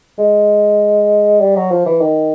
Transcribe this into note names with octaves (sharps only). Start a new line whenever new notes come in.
G#3
G3
F#3
F3
E3
D#3